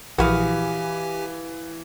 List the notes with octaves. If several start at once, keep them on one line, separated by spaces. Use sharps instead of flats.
A#1 E3 F#4 G4 F5 G#5 B5 D#6